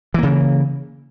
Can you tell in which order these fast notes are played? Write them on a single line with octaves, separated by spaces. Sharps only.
E3 A#3 C#3